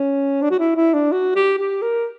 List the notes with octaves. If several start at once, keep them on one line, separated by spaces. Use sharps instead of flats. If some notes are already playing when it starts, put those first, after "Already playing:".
Already playing: C#4
D4
F#4
E4
E4
D4
F#4
G4
G4
A#4